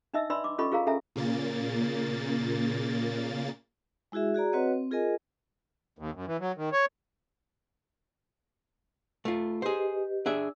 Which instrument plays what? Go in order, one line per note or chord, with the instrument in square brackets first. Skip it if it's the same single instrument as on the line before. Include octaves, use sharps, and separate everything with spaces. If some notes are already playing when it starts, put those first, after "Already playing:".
[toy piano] D4 D#4 D#5 E5 E6
D4 B4 D5 B5 C6 E6
D6
C#4 F4 A4 D#5 B5 C#6
F4 G#4 A#4 F5 A#5
C#4 A4 E5 G#5 A#5
[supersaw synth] A#2 C#3 A#3 A6
[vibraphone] G#3 E4 F#4 G#4 E5
F#4 G#4 D5 A#5
C4 F#4 B4 C#5 D#5 F#5
C4
F4 G#4 A#4 D#5 G#5
[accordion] D#2
F#2
E3
F#3
D#3
C#5
[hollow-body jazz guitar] A3 F4
[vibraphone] G4 B4 D#5 [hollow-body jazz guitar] G#4 C5
[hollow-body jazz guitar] D4 G#4 E5 [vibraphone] E6